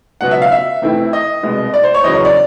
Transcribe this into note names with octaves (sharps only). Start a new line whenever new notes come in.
C#2 B2 F#3 B3 F#5
E5
F5
E5
C3 E3 A3 C4 E4
D#5
C2 B2 G#3
D5
C5
C#5
E2 C#3 F#3 D#5
C#5
D5